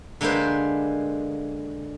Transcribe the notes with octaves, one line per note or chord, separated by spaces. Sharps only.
D3 G#3 A#3 B4 C5